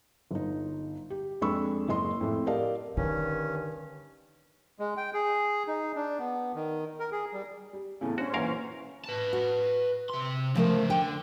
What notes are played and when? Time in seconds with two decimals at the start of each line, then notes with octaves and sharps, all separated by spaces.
0.31 G1 D#4
1.10 G4
1.41 F2 G#3 D4 B5 C#6 E6
1.89 F#1 D#5 C6
2.21 F2 A2
2.47 G4 A#4 D5 D#5 F5 A5
2.97 G2 D3 D#3 C#4
4.79 G#3
4.97 G5
5.14 G#4
5.67 D#4
5.96 D4
6.19 B3
6.55 D#3
7.00 A#4
7.12 G#4
7.33 G3
7.73 G3
8.01 E2 A2 C#3 A4 G#5
8.18 C#4 D4 F#4 C5
8.34 F#2 A#2 E3 A#3 A#4 F5
9.05 B4 A5
9.33 F#4
10.09 C3 C6
10.55 C#3 F3 A3 A#4 C5
10.90 D3 G5